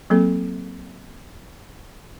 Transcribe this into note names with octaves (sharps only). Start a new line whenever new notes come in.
F#3 A#3 C4 A4